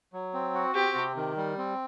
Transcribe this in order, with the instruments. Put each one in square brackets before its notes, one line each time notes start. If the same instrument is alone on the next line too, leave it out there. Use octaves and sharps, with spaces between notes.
[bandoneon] F#3
C4
F#4
[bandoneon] C4 [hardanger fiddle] G4
[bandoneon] C3
D#3
G3
C4